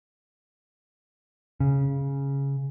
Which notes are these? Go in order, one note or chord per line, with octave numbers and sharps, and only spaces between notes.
C#3